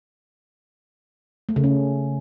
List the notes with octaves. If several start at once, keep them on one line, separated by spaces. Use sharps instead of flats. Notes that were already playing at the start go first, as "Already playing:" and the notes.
A3
C#3
C#4